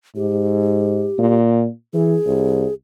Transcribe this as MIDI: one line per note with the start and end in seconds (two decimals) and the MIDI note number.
0.16 1.08 44
0.16 1.38 67
1.19 1.66 46
1.94 2.16 52
1.94 2.74 68
2.26 2.65 36